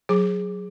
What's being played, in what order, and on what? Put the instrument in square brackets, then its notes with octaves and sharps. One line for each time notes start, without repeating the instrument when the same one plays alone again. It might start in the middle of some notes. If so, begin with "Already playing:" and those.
[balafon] F#3 G#4